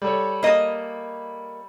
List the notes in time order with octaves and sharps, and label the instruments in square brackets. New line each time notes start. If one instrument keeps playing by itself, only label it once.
[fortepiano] G3 A4 C#5
[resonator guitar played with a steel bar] A#3 D#5